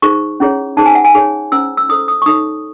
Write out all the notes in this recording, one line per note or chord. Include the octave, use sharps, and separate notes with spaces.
D#4 G#4 C5 C#6
C#4 E4 G#4 C#5
D#4 G#4 C5 A5
G#5
F#5
G#5
D#4 G#4 C#5
C#4 E4 C5 E6
E6
E4 A4 C5 D#6
D#6
C#6
D#4 A4 C#5 D#6